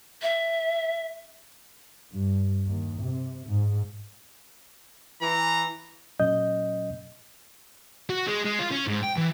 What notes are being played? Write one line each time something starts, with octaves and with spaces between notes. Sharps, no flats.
E5
G2
D#2
C3
G#2
E3 A#5
A#2 F#3 C#4 D#5 G6
F#4
G#3
G#3
F4
C#4
G#2
G5
E3